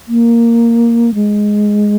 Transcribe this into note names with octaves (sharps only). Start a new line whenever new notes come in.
A#3
G#3